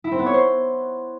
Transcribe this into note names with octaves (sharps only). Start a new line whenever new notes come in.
E4
C4
B3
C#5
C5